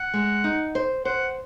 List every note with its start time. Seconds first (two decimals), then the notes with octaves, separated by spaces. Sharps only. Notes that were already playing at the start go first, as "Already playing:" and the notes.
Already playing: F#5
0.13 G#3
0.44 D#4
0.75 C5
1.05 C5 F#5